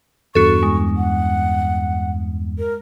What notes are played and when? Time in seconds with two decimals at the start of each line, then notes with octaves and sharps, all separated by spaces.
0.35 E2 G2 F#4 A4 C#6
0.63 G#3
0.97 F#5
2.59 A#4